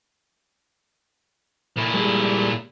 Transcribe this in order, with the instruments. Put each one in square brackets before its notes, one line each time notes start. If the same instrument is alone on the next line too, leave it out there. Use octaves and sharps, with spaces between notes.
[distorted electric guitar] A#2 E4
[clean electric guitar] G3 G#3